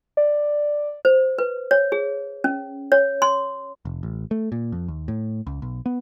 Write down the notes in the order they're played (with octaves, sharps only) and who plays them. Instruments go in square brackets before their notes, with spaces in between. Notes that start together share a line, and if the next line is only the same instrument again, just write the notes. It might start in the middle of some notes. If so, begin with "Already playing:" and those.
[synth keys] D5
[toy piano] C5
B4
C#5
G#4
C#4
C#5
C6
[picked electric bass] F1
A1
A3
A#2
F2
D#2
A2
C#2
B1
B3